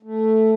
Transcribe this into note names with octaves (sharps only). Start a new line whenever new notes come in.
A3